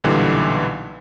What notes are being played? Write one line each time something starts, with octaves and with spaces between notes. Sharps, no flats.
B1 A#2 D3 E3 G3